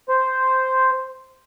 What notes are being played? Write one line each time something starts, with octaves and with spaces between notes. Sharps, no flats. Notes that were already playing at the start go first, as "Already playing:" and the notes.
C5